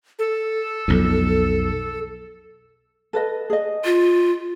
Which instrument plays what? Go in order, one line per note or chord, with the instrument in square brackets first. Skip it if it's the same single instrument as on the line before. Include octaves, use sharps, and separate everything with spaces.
[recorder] A4
[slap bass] B1 F2
[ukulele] A4 B4 D#5
G#4 D#5
[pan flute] F4